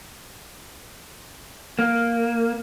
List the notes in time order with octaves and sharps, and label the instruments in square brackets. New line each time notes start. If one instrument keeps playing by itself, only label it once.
[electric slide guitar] A#3